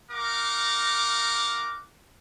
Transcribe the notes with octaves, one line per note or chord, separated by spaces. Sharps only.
D#4 A#4 F5 F#5 D6